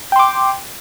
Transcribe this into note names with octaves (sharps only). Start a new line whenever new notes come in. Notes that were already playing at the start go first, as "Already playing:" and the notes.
G5 C6 D6